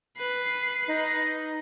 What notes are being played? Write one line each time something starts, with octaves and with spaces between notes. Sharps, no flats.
B4 C7
D#4